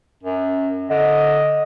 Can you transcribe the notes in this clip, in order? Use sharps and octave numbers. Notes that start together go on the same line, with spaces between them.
F#2
D3 D#5